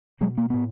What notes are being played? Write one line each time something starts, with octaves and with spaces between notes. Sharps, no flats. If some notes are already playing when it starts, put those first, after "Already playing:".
B2 F#3 G#3
A#3
A2 B3